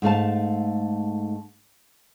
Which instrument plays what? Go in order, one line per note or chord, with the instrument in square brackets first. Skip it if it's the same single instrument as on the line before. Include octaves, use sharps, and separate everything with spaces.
[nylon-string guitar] G#2 A3 F5 A5